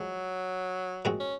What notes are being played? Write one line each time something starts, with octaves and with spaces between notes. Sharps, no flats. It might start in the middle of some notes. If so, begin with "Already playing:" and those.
Already playing: F3 F#3 G#3
A#2 G#3 C4 F#4
C#4